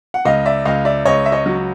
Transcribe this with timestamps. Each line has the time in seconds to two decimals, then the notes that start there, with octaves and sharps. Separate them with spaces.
0.14 F#5
0.25 C#2 D#5 F5
0.46 D5 E5
0.65 C#2 D#5 F5
0.85 D5 E5
1.05 C#2 C#5 D#5
1.26 E5
1.32 C#5 D#5
1.46 F#3